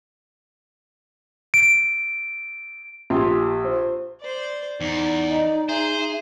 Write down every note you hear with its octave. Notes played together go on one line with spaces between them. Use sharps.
D7
A#1 G4 C6
C5
C5 D5
E2 D#4 D5
D#5
G#4 C5 E5